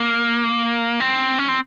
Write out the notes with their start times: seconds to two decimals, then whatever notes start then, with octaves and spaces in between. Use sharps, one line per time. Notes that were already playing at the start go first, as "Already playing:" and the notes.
Already playing: A#3
1.00 C4
1.39 C#4
1.48 C4